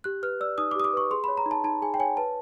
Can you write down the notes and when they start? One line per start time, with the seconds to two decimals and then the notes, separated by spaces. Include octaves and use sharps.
0.04 G4 F#6
0.23 B4 F6
0.40 D5 E6
0.58 D#4 D#6
0.71 D6
0.75 G4 D#6
0.84 D6
0.93 B4 C#6
1.11 G#4 C6
1.24 B5
1.28 C#5
1.37 A#5
1.46 D#4
1.51 A5
1.64 D#4 A5
1.82 G#4 G#5
1.94 G5
1.99 C#5 G#5
2.17 B4 A5